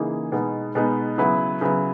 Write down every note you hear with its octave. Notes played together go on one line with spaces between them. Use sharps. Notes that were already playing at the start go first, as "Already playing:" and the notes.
Already playing: C#3 E3 A#3 D#4 G#4
B2 G#3 B3 D#4
B2 G#3 B3 D#4
C#3 F#3 B3 E4 B4
C#3 F#3 B3 E4 B4